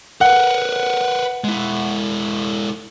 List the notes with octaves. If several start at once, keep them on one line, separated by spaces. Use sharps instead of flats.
A#4 B4 F#5
G#3 E4